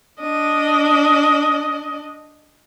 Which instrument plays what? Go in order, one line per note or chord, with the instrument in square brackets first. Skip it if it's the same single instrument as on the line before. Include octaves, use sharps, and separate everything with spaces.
[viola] D4 D#5